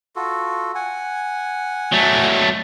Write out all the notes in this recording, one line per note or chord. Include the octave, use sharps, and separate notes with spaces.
F4 F#4 A4
F#5 G#5
F#3 A3